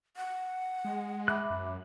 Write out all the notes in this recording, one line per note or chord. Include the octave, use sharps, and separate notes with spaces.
F#5
G#3
E5 B5 D6 F#6
F#2